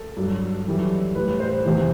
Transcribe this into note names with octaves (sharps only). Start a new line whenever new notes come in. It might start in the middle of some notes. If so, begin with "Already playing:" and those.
Already playing: A4
G2 F#3
F#2 E3 G3
A2 G3 B4
C5
E2 C3 E3